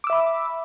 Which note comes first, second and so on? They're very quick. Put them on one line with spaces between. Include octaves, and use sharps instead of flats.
D6 E6 E5 B5